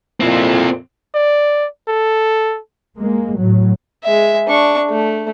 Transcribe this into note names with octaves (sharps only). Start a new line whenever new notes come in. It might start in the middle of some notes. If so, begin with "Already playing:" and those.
F2 A#2 C4 E4
D5
A4
G#3 A#3
A2 F#3
G#3 E5
D4 C#6
A3